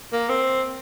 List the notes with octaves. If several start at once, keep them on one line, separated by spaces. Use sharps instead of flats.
A#3
C4